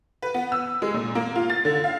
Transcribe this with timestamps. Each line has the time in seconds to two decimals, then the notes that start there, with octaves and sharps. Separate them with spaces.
0.22 B4
0.34 B3
0.52 E6
0.82 G#3
0.94 A#2
1.15 A#3
1.35 F4
1.50 A6
1.65 D3
1.84 F5